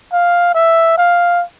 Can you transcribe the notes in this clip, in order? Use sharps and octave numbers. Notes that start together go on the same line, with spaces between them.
F5
E5
F5